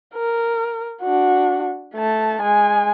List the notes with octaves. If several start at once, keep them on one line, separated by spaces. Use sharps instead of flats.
A#4
D4 F#4
A3 A5
G#3 G#5